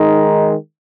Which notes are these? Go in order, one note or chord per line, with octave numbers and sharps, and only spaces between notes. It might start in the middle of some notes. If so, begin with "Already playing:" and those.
Already playing: D#3 G#3 D#4